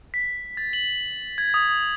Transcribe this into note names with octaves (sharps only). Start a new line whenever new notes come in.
B6
A6
F#7
G#6
D#6